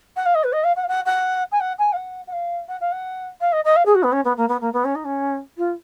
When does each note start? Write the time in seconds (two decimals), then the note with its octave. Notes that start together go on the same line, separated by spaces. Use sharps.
0.16 F#5
0.26 F5
0.35 D#5
0.44 B4
0.53 D#5
0.64 F5
0.76 F#5
0.84 F5
0.88 F#5
1.06 F#5
1.52 G#5
1.60 F#5
1.79 G#5
1.93 F5
1.96 F#5
2.27 F#5
2.32 F5
2.68 F#5
2.81 F5
2.92 F#5
3.41 F5
3.52 D#5
3.64 D#5
3.76 F5
3.86 G#4
3.95 F#4
4.03 B3
4.12 C#4
4.25 B3
4.37 A#3
4.49 B3
4.61 A#3
4.73 B3
4.85 C#4
4.95 D#4
5.05 C#4
5.58 F4